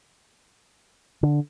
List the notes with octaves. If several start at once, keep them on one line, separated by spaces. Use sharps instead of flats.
D3